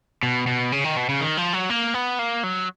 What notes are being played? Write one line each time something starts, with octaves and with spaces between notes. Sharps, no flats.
B2
B2
C#3
D#3
B2
C#3
D#3
F3
F#3
A#3
B3
A#3
F#3